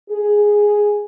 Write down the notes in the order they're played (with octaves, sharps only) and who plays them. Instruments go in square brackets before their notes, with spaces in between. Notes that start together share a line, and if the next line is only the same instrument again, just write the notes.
[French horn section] G#4